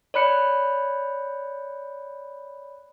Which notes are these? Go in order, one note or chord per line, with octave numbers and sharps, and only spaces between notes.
C#5 D5 B5 F#6 C#7